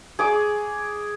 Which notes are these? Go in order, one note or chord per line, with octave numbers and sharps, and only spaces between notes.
G#4 D6